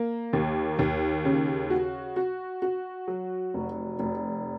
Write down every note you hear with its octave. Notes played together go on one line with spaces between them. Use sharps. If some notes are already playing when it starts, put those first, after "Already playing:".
Already playing: A#3
D#2
D#2
C#3
F#4
F#4
F#4
F#3
F1
F1